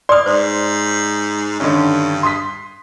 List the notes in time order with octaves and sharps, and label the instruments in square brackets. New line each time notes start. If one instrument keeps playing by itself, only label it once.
[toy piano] D5 D#6 [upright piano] C6 D6 F6
[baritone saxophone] G#2 [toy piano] C5
[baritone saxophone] G2 [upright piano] D3 D#3 C#4
[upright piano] C6 D#6 B6